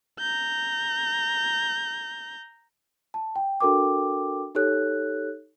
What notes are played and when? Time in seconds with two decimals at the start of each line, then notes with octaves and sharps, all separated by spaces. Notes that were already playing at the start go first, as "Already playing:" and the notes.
0.20 A#5 G6
3.14 A5
3.36 G5
3.60 D4 F#4 A4 A#4 G5 D6
4.55 D#4 G4 A4 C#5 F#6